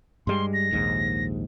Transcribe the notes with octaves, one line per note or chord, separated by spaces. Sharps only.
G2 G3 G#3 C6
A#6
A#1 D#2 G#2